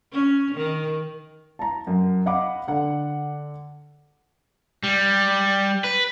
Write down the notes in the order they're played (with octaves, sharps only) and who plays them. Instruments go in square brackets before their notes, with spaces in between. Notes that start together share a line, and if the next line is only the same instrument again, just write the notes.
[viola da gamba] C#4
D#3
[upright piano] A5 A#5
F#2
D#5 F5 F#5 B5 D6
D3 F#5
[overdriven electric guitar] G3
B4